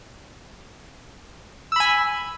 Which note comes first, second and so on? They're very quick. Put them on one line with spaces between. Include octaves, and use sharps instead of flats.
E6 B5 G#5